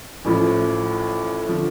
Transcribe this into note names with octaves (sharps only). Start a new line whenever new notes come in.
A1 A2 F3
D3 F3